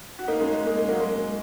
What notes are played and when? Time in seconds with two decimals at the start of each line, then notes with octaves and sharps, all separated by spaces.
0.19 F#4
0.28 A#3 D#4
0.40 G#3 C#4
0.52 G#3
0.66 A#3
0.76 G#3
0.89 F#3 A#3
1.00 G#3